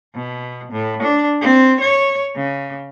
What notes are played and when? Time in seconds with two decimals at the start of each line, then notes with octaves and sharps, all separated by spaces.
0.15 B2
0.72 A2
1.03 D4
1.41 C4
1.81 C#5
2.35 C#3